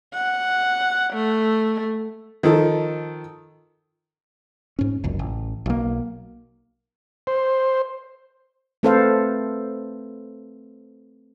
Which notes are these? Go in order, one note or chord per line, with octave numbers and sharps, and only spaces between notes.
F#5
A3
D#3 F3 A4
G#2 C#4
F#1 C#2 F#2
A1
B1 A#3
C5
A3 C4 A4 B4 C5 F5